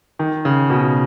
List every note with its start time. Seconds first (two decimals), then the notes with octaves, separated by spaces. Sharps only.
0.19 D#3
0.45 C#3
0.70 B2